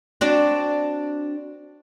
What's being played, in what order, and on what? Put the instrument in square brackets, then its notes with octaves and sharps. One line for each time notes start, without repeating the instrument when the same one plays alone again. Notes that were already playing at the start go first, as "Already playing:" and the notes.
[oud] C4 D4 F#4